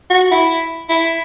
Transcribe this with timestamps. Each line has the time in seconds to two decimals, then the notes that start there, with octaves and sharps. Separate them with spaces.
0.10 F#4
0.31 E4
0.89 E4